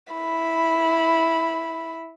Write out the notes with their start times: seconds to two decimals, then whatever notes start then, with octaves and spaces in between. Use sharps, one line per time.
0.13 E4 B5